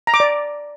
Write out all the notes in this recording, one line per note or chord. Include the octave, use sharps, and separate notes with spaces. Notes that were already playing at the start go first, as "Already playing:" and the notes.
A#5
D6
D5